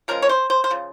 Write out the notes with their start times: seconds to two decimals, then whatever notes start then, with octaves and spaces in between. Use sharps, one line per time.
0.08 C#3 F3 G#3 A#4
0.22 C#5
0.29 C5
0.50 C5
0.64 C5
0.71 C#3 F3